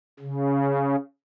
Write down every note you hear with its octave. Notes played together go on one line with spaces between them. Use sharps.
C#3